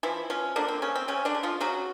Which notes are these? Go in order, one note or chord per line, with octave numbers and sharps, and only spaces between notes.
E3 F3 E4
F3 C#4
D3 A#3 D4
C4
C#3 C#4
C4
C#3 C#4
D3 D4
C#3
F3 F4
C#3 F#3 F#4